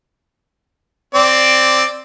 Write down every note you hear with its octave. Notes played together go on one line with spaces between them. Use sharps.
C4 D5